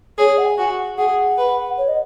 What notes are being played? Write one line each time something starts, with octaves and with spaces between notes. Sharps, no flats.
G#4 C#5
F#5
G#5
F#4
G#4 F#5
B4
C#5
D#5